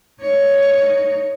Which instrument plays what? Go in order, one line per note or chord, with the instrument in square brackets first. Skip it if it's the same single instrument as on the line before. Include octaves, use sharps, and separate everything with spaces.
[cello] D#4 C#5